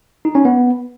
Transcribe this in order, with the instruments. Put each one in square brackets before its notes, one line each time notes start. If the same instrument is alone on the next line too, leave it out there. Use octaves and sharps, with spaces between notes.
[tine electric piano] D#4
C#4
B3